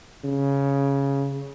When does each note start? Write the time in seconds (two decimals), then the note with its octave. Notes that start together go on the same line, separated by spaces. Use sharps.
0.24 C#3